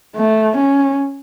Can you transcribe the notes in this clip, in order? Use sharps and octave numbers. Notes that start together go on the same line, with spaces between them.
A3
C#4